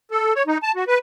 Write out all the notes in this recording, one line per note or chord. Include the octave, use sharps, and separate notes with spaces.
A4
C#5
D#4
A5
F#4
B4